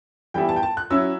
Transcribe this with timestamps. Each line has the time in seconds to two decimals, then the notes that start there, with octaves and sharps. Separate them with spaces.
0.34 E3 G3 B3 E4 G5
0.49 A5
0.56 G5
0.63 A5
0.77 F#6
0.90 F#3 C#4 E4 E6